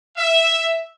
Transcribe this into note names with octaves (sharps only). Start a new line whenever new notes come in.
E5